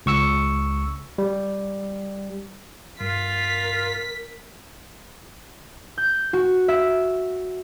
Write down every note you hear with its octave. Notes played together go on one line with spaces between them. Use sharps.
C#2 C#6 E6 C#7
G3
G2 F4 A#4 B6
G6
F#4
E5